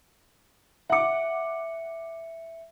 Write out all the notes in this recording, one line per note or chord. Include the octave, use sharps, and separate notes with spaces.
E5 F#5 D6 C#7